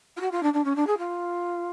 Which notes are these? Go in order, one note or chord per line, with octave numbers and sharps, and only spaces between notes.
F4
F#4
F4
D4
D4
C#4
D4
G#4
F4